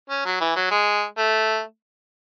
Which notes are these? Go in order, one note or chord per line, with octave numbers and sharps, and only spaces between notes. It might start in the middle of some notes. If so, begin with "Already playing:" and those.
C#4
F#3
E3
F#3
G#3
A3